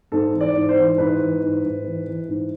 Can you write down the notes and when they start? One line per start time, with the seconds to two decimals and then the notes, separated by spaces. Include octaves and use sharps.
0.12 G#2 A4
0.33 E3
0.41 D5
0.55 G#2
0.69 C5
0.77 E3
0.98 G#2 B4
1.20 E3
1.42 G#2
1.64 G#2
1.84 E3
2.06 E3
2.29 G#2